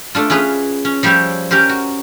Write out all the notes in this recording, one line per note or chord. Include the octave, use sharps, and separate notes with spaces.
A3 D4 F4
C#4 F4 G#4 B4
C#4
F3 G3 G4 C5 C#5 E5
C#4 G4 A#4 C5
F#4